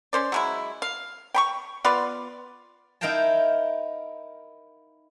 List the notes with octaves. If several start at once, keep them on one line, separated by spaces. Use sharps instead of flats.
C#4 C5 D5
F#3 G#3 E4
F5
G5 B5 C#6
B3 F4 B4 D5
D#4 E4 A#4 F5 G5 A5